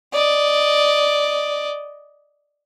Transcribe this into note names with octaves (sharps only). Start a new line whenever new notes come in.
D5 D#5